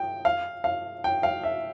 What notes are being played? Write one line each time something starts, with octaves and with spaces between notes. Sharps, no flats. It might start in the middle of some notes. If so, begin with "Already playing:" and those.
Already playing: G5
F5
F5
G5
F5
E5